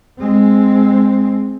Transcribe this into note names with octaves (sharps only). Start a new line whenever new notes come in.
G#3 C4